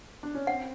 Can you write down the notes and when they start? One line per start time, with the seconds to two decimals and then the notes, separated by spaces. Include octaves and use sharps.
0.23 D4
0.35 C#4
0.47 C4 F#5